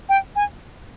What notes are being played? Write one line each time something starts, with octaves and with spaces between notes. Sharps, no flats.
G5
G#5